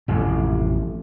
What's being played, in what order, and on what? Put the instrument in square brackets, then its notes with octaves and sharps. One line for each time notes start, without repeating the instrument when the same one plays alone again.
[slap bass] A1 F2 C3